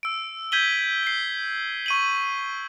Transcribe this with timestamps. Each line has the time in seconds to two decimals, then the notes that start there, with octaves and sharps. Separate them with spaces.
0.03 E6 D7
0.52 G6 G#6 B6 D#7 F#7 G7
1.03 B6 C7
1.86 C#6 D#7 F#7